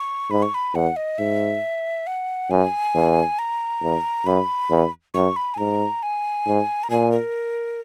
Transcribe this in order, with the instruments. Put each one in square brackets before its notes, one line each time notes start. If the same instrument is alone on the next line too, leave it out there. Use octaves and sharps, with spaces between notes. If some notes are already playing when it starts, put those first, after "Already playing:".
Already playing: [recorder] C#6
[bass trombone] G#2 [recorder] B5
[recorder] C#6
B5
[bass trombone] E2 [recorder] F#5
[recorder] D#5
[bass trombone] G#2 [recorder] E5
[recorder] F#5
[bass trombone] F#2 [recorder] G#5
[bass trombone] E2
[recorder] A#5
[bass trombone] E2
[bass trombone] F#2 [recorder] B5
[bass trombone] E2
[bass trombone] F#2 [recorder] C#6
[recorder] B5
G#5
[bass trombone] G#2 [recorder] A#5
[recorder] G#5
[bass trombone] G#2
[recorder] A#5
[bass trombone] A#2 [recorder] G#5
[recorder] A#4